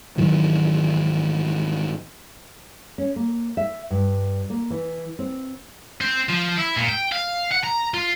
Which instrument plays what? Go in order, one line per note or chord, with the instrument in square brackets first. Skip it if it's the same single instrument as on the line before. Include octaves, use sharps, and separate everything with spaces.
[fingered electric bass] G#2 D#3 E3 F#3
[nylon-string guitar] C#4
A#3
E5
G2
A#3
E3
C4
[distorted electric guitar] C4
F3
E4
A#2
G5
F5
F#5
A#5
F4